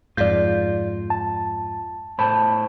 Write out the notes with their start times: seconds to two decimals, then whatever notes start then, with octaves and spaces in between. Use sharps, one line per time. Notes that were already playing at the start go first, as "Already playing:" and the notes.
0.17 F2 G#2 F4 D5 G6
1.10 A5
2.19 A2 C5 A5 B5